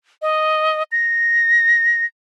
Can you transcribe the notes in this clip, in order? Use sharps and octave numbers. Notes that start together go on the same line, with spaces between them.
D#5
A#6